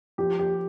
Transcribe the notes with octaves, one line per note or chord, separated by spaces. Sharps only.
F3 G4
G4